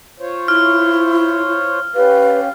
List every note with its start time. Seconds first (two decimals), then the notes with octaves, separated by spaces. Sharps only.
0.20 F4 C5 C#5
0.48 E4 F6
1.95 C#4 G4 B4 F5